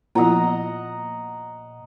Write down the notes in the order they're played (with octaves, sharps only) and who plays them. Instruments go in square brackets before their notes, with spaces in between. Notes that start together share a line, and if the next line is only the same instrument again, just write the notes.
[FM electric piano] A#2 [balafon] F3 B3 E4 [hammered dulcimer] D#5 F#5 A#5